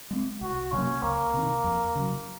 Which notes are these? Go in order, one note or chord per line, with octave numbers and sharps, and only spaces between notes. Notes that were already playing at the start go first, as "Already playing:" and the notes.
G#3 C4
C2 F#4
C3 F#3 A#3 C#4
C#2 A#3
C3 D#3
F2
C#3 F#3